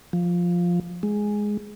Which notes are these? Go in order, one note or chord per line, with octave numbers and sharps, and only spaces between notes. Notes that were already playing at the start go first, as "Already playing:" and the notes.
F3
G#3